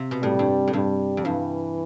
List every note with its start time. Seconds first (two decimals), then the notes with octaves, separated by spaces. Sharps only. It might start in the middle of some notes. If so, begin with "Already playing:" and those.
Already playing: C3
0.11 B2
0.22 A2 G3
0.39 G2
0.67 A2
0.73 G2 G3
1.17 F2
1.25 G2 E3